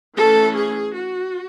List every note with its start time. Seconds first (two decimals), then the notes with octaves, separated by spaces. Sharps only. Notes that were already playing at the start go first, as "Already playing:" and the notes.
0.16 E3 A3 C#4 A4
0.55 G#4
0.94 F#4